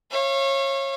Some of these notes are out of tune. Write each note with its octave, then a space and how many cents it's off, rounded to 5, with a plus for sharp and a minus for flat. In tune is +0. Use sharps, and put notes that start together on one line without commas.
C#5 -25 F5 -35